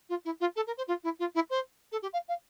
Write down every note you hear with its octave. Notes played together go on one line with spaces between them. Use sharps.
F4
E4
F4
A4
A#4
C5
F4
E4
F4
E4
C5
A4
G4
F5
F5